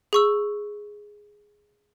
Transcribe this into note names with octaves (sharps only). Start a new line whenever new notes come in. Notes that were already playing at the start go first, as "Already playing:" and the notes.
G#4 C#6 E6